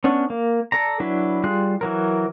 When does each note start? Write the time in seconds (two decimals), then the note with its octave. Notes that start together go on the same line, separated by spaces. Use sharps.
0.04 B3 C#4 D4
0.30 A#3
0.72 A4 D5 A#5
1.00 F#3 D4 E4 B4
1.44 G3 F4 G#4 F#6
1.81 E3 F#3 A#4